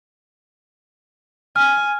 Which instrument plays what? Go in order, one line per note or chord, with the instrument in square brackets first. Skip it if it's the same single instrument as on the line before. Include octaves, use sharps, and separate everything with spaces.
[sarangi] G#5 [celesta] F6